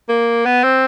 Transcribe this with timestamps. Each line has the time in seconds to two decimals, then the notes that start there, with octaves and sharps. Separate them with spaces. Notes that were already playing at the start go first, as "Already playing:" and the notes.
0.09 A#3
0.45 B3
0.64 C4